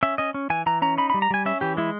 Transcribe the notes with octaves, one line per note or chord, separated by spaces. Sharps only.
C#4 E5
C#4 D#5
C#4
E3 G#5
E3 A#5
C#4 A#5
D#4 B5
B5
G3
A#5
G3 G#5
C#4 E5
E3 G4
G#3 E4